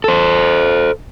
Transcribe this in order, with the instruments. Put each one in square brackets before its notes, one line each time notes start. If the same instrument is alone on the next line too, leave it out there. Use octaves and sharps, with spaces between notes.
[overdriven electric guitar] A4 C5